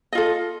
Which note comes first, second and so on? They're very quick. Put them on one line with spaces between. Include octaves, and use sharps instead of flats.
D#5 F4 A4